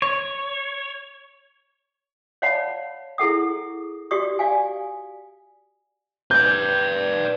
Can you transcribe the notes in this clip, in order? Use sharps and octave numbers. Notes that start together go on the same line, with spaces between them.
C#5
C#5 D5 F5 F#5 A5 B5
E4 G#4 A4 F#5 D#6
F#4 G4 D5 C#6 D#6
D5 F5 G#5
B4 D5 G6